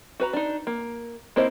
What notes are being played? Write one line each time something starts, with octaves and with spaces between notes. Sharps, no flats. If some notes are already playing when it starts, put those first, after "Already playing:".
F#4 B4 A#5
D4 D#4
A#3
A#3 C4 E4 C5 D#5